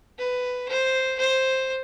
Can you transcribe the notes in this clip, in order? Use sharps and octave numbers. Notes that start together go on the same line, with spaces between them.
B4
C5
C5